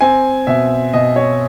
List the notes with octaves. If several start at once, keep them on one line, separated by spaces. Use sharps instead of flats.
C4 G#5
B2 E5
B2 D#5
C#5